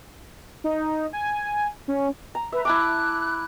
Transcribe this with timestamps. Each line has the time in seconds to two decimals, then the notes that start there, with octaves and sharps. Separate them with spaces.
0.64 D#4
1.13 G#5
1.88 C#4
2.35 A#5
2.52 B4 E5
2.65 E4 A5 D6 F#6